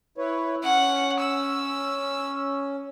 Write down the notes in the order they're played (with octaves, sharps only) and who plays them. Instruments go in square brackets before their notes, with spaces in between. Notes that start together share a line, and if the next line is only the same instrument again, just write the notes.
[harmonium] E4 B4 C#5
[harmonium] C#4 [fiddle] F#5
[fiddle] E6